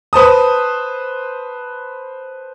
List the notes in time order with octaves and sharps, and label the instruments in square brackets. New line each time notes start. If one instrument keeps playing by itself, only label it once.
[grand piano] B4 C5 A5 D#6